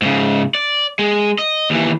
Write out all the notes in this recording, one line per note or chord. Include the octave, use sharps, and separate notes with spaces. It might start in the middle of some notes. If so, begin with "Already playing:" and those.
G#2 C#3
D5
G#3
D#5
D#2 E3